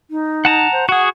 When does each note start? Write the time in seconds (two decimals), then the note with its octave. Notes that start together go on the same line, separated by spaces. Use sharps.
0.11 D#4
0.45 F#5 A5 A#5
0.72 C5
0.89 F#4 G#4 F#5